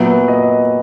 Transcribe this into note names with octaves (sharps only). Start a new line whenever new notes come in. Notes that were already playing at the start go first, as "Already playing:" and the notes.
Already playing: A#2 F#3 B3 E5
D#5